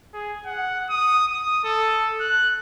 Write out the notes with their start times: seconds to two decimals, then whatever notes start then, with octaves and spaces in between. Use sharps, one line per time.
0.14 G#4
0.46 F#5
0.89 D#6
1.28 D#6
1.64 A4
2.21 F#6